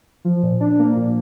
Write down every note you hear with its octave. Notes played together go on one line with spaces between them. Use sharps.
F3
A#2
D4
A#3
A#2